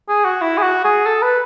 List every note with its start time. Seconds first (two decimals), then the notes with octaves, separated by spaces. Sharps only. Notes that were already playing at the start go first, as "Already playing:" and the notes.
0.09 G#4
0.25 F#4
0.41 E4
0.58 G#4
0.62 F#4
0.84 G#4
1.06 A4
1.22 B4